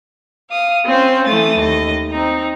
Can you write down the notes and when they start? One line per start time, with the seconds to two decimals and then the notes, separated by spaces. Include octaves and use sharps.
0.50 F5 D#6
0.85 C4 C#4 F4 C5
1.26 E3 A3 D#6 A6
1.57 D#2 D#5
2.10 C4 D#4 A#5